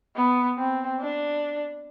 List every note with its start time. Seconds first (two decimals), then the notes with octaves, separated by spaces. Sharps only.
0.16 B3
0.58 C4
1.00 D4